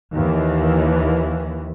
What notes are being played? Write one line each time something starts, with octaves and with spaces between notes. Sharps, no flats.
D#2 E3